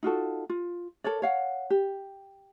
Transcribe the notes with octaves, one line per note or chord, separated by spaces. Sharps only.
D#4 F4 F#4 A4
F4
A4 A#4 C#5 D5
C#5 F5 F#5
G4